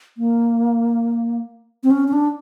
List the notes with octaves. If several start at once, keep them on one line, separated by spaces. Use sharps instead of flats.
A#3
C4
C#4
C#4
D4